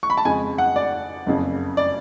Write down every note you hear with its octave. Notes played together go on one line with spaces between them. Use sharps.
C#6
B5
A5
F2 C#3 G#3 G#5
F#5
D5
F#1 F2 C#3
D5